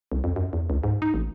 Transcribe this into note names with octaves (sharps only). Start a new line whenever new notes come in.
C2
F2
F#2
E2
C#2
G#2
D#4
A1